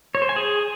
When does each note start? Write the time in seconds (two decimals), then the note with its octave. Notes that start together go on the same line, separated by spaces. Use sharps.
0.15 C#5
0.22 C5
0.29 G#5
0.36 G#4